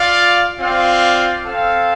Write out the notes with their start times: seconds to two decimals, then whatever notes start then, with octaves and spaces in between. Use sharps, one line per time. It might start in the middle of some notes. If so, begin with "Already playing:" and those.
Already playing: F4 D5 F5
0.59 C4 F4 D5 F5
1.46 C4 A4 F5